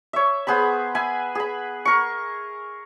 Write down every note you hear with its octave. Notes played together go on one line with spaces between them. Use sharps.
C#5 E5
B3 G#4 C5 B5
E5 G#5 B5
G#4 B5
A#4 C#6